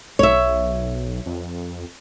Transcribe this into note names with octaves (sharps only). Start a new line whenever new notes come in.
B1 C#5 E5
F2